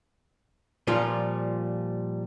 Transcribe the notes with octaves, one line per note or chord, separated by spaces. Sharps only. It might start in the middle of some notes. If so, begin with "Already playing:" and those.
A#2 F3 G3 F4